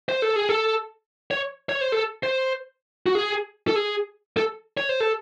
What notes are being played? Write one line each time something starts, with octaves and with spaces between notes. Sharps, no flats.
C5
A4
G#4
A4
C#5
C#5
C5
A4
C5
F#4
G#4
A4
G#4
A4
C#5
C5
A4